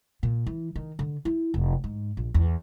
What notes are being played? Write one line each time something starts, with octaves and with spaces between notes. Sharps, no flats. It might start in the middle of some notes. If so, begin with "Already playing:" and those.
A#2
E3
D#3
D3
E4
F1
G#2
A#1
E2